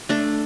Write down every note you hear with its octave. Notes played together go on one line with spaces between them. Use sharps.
A3 D4 A4